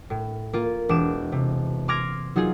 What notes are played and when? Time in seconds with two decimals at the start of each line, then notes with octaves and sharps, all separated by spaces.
0.10 A2
0.53 A#3 F4
0.89 E1 D6 E7
1.32 C3
1.88 C6 D6 F6 G#6 A#6 D7
2.36 F#3 D#4 F4 G#4